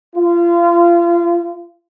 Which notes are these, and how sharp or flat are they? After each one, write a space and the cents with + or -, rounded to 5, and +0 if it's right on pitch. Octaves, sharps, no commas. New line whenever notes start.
F4 -30